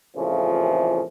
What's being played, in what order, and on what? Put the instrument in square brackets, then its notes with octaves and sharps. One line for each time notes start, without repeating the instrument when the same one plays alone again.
[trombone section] A1 F2 A#2 C#3 E3 F3